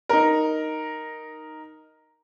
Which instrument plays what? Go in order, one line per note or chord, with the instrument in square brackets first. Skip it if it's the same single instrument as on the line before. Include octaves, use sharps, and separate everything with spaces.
[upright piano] D#4 A#4